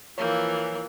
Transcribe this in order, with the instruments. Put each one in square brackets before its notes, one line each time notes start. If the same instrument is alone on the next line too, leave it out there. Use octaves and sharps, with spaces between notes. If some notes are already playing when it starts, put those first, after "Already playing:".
[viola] E3 F3 [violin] A#3 [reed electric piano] C#5 G6